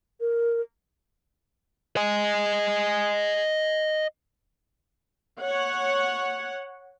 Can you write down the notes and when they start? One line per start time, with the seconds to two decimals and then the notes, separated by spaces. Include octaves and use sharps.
0.20 A#4
1.97 D#5 G#5
5.41 C#5 F#5